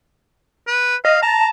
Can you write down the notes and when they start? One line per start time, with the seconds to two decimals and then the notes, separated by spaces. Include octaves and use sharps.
0.67 B4
1.05 D#5 F5
1.23 A5 A#5